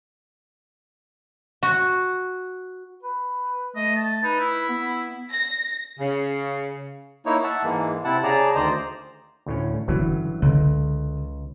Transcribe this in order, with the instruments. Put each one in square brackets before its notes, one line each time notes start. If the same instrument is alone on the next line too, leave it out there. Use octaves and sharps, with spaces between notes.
[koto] F#4
[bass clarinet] B4
[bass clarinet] A3 [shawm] D#5
[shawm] A5
[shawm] D#4 [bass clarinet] B4
[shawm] E4
[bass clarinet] B3
[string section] A#6
[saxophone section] C#3
[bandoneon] A#3 D#4 E4 C#5
E5 F#5 A5
G#2 E3 G#3 A#3
C3 E4 F#5 A5
C#3 G#4 D5 A5 A#5
D2 D#3 C5 D5 D#5 A#5
[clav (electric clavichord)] D2 A2 C#4
[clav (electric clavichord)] G2 E3 F#3 [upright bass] D3 C#4
[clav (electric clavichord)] C#2 [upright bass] D3